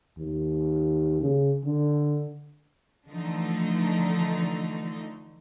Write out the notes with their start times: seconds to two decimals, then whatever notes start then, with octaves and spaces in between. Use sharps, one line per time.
0.19 D#2
1.22 C#3
1.66 D3
3.08 D3 E3 F3 A3 D#4